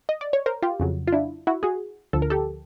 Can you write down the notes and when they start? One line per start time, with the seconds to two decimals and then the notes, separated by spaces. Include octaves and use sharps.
0.09 D#5
0.21 D5
0.33 C#5
0.46 A#4 C5
0.62 F4 G4
0.80 F2 C#3 F#3
1.07 F4
1.13 D4 E4
1.47 E4 F#4
1.63 F#4 G#4
2.13 D2 D3 F3 A4
2.22 A#4
2.30 G4 A4